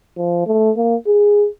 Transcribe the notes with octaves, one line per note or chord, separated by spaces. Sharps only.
F3
A3
A#3
G#4